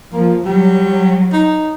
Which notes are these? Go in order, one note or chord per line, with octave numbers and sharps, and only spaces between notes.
F3 A#3
F#3 G3
D#4